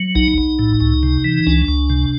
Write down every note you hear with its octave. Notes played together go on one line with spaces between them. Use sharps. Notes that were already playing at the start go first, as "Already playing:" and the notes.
Already playing: F#3
B1 D#4
B1
A2
C#2
C3
E3
C#2 D4
C#2
C3